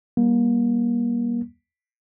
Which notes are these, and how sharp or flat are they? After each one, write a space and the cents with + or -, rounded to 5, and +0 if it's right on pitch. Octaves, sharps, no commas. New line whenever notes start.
G3 +0 A#3 +35